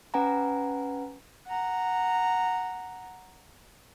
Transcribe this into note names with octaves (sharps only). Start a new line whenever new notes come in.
C#4 B4 F#5 G#5 A#5
F#5 A#5